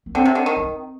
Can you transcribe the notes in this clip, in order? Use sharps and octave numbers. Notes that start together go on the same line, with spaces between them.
A#3
D3 C4
C3
D3
D#3
C4